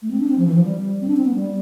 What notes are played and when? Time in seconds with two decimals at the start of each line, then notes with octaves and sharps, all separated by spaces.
0.02 A3
0.11 C4
0.20 D4
0.28 C4
0.38 F3
0.46 E3
0.54 F3
0.63 G3
1.01 C4
1.08 D4
1.17 C4
1.25 B3
1.35 G3